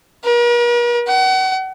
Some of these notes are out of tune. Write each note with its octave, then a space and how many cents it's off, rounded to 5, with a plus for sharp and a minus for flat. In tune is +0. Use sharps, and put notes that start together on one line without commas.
A#4 +45
F#5 +35